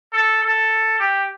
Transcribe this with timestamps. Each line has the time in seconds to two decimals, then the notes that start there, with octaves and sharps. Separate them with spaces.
0.13 A4
0.43 A4
1.00 G4